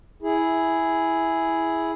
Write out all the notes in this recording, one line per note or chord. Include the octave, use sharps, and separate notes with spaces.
E4 G#4